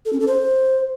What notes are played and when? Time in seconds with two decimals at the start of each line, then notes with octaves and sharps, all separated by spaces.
0.05 A4
0.13 C#4
0.20 A4
0.27 C5